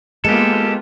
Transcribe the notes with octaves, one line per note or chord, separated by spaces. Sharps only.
G#3 A#3 B3 F4 G4 A4